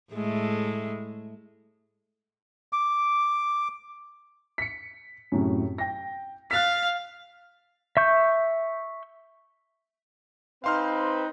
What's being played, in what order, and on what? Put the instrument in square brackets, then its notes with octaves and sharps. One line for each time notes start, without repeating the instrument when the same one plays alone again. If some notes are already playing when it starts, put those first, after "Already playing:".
[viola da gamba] A2 G#3 A3
[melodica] D6
[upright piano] B6 C#7
F#2 A2 C3
G5 A#6
[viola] F5 [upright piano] F#6 A6 B6
[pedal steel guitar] E5 C#6 G6
[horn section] C4 D#4 B4 [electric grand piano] F5 C6 F6